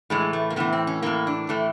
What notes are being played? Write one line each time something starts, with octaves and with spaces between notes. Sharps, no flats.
A2 E3 G#3
A3
A#3
A2 E3 B3
C4
C#4
A2 E3 A#3
D4
A2 E3 A3